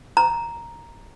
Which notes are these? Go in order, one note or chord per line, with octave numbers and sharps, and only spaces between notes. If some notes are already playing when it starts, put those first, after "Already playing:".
A#5